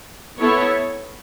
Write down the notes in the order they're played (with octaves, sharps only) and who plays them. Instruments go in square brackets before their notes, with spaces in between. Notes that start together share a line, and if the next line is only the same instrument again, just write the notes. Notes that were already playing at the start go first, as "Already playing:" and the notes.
[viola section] B3 E4 A4 C#5